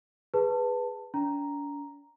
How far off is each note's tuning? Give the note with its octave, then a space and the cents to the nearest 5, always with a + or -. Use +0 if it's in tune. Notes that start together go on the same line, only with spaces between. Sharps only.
G#4 -15 B4 +0 A5 +15
D4 -45 A#5 +0